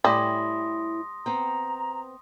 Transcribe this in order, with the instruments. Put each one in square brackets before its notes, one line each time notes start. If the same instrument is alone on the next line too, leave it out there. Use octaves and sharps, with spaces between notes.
[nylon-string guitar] A2 E4 G#5 [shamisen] G3 [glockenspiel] C6 D#6 A#6
[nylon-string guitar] B3 C4 G5 [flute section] A#5